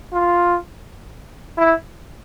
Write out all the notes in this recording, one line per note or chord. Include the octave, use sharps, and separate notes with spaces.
F4
E4